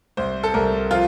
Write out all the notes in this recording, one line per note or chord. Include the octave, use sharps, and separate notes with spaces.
C2 C5
A4
C2 A#4
F3 F4